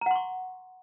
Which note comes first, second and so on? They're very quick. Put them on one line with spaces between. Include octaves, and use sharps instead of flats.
A#5 F#5 C6 C#6